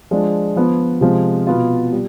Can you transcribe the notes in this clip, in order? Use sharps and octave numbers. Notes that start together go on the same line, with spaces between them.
F3 G#3 D4
F3 B3 F4
C3 F3 G#3
B2 B3 F4
G3